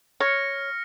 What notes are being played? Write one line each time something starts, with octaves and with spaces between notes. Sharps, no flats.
C#5 F6 A#6 C#7